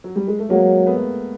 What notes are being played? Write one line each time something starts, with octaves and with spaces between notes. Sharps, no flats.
F#3
G3
G#3
A3
F#3 G#3 A#3
A3 B3